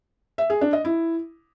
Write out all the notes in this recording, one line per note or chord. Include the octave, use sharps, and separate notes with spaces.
E5
G#4
D4
D#5
E4